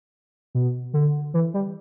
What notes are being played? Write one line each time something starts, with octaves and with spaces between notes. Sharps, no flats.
B2
D3
E3
G3